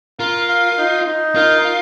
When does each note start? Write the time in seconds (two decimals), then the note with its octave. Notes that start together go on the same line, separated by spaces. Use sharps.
0.19 F4 A#4
0.49 F5
0.78 D#4
1.06 D#4
1.36 F4 A#4
1.65 F5